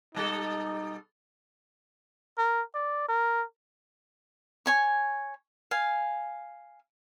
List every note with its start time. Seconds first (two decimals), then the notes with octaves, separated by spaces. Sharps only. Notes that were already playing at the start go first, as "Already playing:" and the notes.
0.15 B2 G3 D#4 A4
2.38 A#4
2.74 D5
3.08 A#4
4.66 C#5 G#5 C#6
5.71 F5 G#5